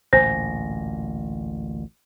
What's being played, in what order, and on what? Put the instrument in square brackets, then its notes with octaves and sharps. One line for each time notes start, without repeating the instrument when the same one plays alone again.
[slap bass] A1 D2 A#2 [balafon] C5 [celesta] G#5 A#6